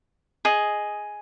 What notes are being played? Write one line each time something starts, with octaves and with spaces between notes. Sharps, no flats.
G#4 D#5